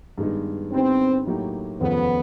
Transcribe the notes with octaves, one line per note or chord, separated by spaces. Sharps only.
G2 D#3 G#3 B3 D#4
D3 G3 B3 C4 D#4
A2 F#3 A#3 D#4 G4
F1 D#2 C#3 F3 B3